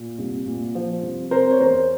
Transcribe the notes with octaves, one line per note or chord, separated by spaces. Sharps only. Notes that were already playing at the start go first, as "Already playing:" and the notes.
Already playing: A#2
C2
A#2
F3
C2
C3 A#4 C5
C#5
E2 A#4 C5